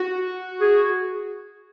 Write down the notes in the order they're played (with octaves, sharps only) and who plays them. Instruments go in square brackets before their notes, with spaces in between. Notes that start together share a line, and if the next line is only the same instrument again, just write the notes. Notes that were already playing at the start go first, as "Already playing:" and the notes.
Already playing: [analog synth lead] F#4
[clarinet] G#4